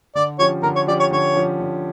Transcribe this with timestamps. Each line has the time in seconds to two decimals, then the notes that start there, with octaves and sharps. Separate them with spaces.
0.15 D3 D5
0.39 F3 C#4 G4 C#5
0.63 D3 A#4
0.75 C#5
0.87 F3 C#4 G4 D5
1.00 C#5
1.11 D3 C#5
1.36 F3 C#4 G4
1.60 D3